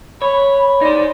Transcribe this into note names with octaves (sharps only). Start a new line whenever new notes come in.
C#5 B5
D#4 C5 D5